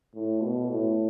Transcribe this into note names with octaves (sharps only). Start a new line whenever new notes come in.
A2
B2
A2